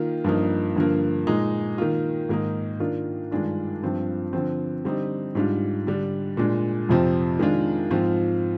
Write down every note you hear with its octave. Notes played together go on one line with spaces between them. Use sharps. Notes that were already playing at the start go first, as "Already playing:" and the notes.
Already playing: D#3 A#3 F4
G2 F3 A#3 D#4
G2 D3 F3 A#3
A#2 G#3 D#4
D#3 A#3 F4
G#2 D#3 A#3 D#4
D#3 A#3 D4 F4
G2 D#3 G#3 D4 F4
G2 F3 C4 F4
D3 F3 C4
D3 G3 C4 D#4
G#2 G3 D4 F4
D3 G3 D4
A#2 G#3 D4
F2 C3 F3 C4
D#3 G#3 D4 F4
G#2 F3 C4 F4